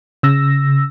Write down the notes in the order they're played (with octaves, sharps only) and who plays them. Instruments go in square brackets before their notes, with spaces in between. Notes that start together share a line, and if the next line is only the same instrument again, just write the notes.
[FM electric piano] C#3 E6 A#6